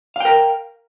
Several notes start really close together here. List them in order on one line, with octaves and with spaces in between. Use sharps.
F5 G5 A#4